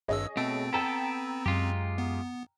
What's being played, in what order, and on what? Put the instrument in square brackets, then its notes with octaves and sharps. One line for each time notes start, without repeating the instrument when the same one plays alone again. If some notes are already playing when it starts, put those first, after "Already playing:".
[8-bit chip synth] G#1 G2 E6 [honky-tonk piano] G#4 C#5 D#5
[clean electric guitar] B2 A3 [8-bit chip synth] C4 [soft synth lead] D7
[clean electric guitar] B3 A4 [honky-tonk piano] G5 A#5 E7
[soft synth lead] F#2 [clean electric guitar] G#3 F4 G4
[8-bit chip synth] B3